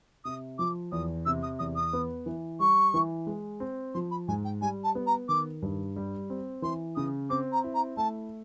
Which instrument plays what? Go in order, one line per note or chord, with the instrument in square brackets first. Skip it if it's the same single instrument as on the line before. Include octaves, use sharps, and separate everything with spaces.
[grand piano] C3 [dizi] D#6
[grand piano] F3 [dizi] D6
[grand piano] E2 [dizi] D#6
[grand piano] C3 [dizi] E6
[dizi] D#6
[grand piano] E2 [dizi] D#6
[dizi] D#6
[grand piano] B3
E3
[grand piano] G3 [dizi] C#6
[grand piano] E3
G#3
C4
[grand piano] F3 [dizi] C6
[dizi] B5
[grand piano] G#2 [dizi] G#5
[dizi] G5
[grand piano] G3 [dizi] G#5
[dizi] A5
[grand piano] B3
[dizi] A#5
[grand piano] D#3 [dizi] D6
[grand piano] G2
G3
C4
[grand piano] E3 [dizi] C6
[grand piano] C#3 [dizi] D#6
[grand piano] C4 [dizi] D6
[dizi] A#5
[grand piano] E4
[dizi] A#5
[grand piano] A3 [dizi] A5